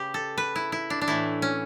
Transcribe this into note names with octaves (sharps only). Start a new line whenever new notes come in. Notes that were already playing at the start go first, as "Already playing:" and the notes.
Already playing: C#3 G4 B4
A4
B4
E4
E4
D4
D4
A2 E3 A3 E4
C#4